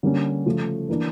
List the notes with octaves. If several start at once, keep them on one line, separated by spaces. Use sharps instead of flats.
D3 G3 A#3 C#4
C#3 F3 A3
E3 A#3 D4